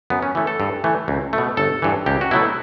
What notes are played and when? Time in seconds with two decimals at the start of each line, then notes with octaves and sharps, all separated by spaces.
0.10 F#2 B3
0.23 C#4
0.35 E3 A3
0.47 A4
0.60 G2
0.84 E3 A3
1.08 C#2
1.33 A3
1.38 B2
1.57 G1 A4
1.82 G2 E3
2.06 C#2 G4
2.21 F#4
2.31 B2 F#3 A3 E4